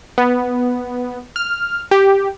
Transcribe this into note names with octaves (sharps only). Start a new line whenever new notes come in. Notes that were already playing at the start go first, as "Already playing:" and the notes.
B3
F6
G4